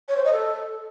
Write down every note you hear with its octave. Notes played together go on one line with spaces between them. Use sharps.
C#5
C5
D#5
A4